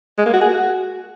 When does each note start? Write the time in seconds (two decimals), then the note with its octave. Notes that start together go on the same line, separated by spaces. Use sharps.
0.18 G#3
0.26 A#3
0.33 F#4
0.41 G#4
0.49 F#4